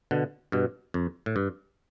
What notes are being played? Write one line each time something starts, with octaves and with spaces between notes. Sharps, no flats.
B2 D3
G2 B2
F2
A2
G2